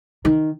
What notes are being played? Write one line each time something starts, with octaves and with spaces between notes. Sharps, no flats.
D#3